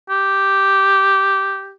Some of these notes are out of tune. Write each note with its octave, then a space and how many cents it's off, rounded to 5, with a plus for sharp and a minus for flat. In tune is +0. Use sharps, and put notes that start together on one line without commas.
G4 -5